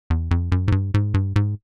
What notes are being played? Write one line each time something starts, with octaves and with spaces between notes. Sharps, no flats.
E2
F2
F#2
G#2
G2
G#2
G2
G#2